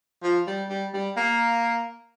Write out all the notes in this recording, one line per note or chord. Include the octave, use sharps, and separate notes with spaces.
F3
G3
G3
G3
A#3